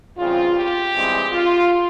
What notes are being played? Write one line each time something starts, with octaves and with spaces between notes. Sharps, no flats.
E2 C#3 G3 C4 F4
G4
G2 E3 G#3 C4
F4